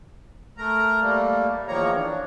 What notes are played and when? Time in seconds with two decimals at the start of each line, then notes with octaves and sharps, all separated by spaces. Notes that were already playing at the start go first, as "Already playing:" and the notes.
0.58 A3 A#4 A#5
1.01 G3 A3 A#3
1.68 E2 D#3 F3 A#3 C#5 A#5
1.95 D4